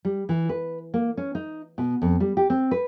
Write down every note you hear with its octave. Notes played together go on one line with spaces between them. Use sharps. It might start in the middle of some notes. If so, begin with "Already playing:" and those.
G3
E3
B4
A#3
C#4
D#4
B2
F2
G3
G4
C4
B4